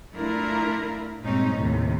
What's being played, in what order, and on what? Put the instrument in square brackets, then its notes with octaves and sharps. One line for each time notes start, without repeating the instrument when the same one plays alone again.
[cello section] A3 D4 E4 F4 A#4
G2 A#2 G#3 C4 C#4 D#4
D#2 A2 C3 D#3